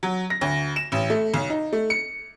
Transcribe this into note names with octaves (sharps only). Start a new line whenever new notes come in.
F#3
A#6
D2
E7
A1
A3
B1
D#4
A3
C#7